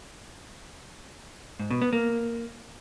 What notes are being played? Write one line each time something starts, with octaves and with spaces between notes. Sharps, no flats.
G#2
B2
B3
A#3